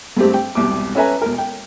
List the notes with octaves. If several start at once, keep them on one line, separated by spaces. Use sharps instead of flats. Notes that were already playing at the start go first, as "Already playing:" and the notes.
G2 G#3 A3 C4 G4
G5
E1 C2 D6
C#4 A4 B4 E5 G#5 A#5
E1 A#4
G5